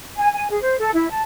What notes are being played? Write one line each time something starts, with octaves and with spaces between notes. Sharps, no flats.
G#5
G#5
G#4
C5
A4
E4
A5